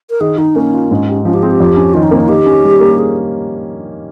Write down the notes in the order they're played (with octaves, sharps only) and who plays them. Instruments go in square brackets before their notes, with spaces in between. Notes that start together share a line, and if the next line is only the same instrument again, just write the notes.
[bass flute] A#4
[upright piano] D#3 [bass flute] G#4
[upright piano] D#3 [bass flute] D#4
[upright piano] A#3 [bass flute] C#4
[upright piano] F4
G#2
G4
[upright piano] F3 [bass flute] C#4
[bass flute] G4
[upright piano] C4 [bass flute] G#4
[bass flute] G4
[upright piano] F2
C#4
[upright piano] D#3 [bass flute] F4
[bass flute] D#4
[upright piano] A#3 [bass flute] C4
[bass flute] D#4
[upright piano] D#3 [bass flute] G4
[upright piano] C#4
G3
A#3
[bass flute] G#4